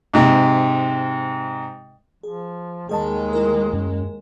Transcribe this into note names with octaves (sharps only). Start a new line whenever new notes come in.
G#2 C3
F3 G#4
D#2 D#3 G#3 G#4 D#5 A5
E4 A#4
F#2